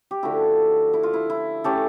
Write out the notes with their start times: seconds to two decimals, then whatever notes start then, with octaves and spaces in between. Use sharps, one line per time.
0.11 G4
0.23 D3 F3 A3 E4 F#4
0.93 E4
1.03 F4
1.14 E4
1.30 E4
1.64 E3 A3 C#4 G4 A4